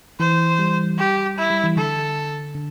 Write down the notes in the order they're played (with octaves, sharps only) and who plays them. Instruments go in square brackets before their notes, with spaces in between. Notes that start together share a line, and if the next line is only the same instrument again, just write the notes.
[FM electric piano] E3 [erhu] C5
[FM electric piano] G3
[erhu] G4
E4
[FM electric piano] G3
E3
[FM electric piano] D3 [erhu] A4
[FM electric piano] D3